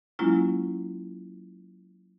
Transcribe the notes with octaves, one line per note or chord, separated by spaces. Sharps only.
F#3 G#3 A#3 C#4 E4 F4